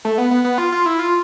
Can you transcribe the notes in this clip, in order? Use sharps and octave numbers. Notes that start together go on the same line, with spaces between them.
A3
B3
B3
B3
F4
F4
E4
F4